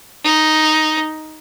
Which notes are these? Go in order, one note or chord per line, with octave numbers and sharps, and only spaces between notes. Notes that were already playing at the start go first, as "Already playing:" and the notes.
D#4